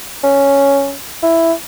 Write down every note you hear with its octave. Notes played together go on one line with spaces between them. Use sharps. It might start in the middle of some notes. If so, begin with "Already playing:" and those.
C#4
E4